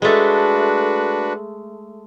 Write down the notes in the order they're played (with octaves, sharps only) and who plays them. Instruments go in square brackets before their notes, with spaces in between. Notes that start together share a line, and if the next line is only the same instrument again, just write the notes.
[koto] G#3 A3 [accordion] D4 F#4 B4